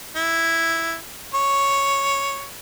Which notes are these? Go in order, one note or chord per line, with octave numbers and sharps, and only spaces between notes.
E4
C#5